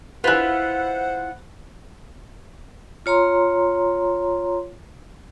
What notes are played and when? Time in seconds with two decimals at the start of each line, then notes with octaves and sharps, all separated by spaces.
0.24 E4 F4 B4 C5 F#5 F#6
3.06 F4 C#5 A#5 C6